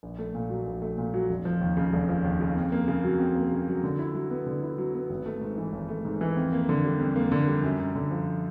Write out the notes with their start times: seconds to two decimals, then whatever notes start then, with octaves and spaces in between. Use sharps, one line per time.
0.03 A#1
0.19 A3
0.35 A#2
0.50 F#3
0.66 A#1
0.82 A3
0.98 A#2
1.14 F#3
1.29 F1
1.45 F3
1.61 D#2
1.77 C#3
1.93 F1
2.09 F3
2.24 D#2
2.41 C#3
2.56 F2
2.72 A#3
2.88 C#3
3.04 F#3
3.20 F2
3.35 A#3
3.52 C#3
3.68 F#3
3.83 D3
3.99 E4
4.15 F#3
4.30 B3
4.47 D3
4.63 E4
4.78 F#3
4.94 B3
5.10 G#1
5.26 A3
5.41 G#2
5.58 E3
5.73 G#1
5.89 A3
6.05 G#2
6.21 E3
6.37 F2
6.53 A#3
6.69 D3
6.84 G3
6.99 F2
7.16 A#3
7.32 D3
7.48 G3
7.63 F#2
7.80 F#2
7.95 D3
8.11 F3